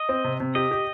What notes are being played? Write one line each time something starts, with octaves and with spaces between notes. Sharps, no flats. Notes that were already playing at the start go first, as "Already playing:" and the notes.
Already playing: D#5
C4
C3
C3
G4 D#5
G4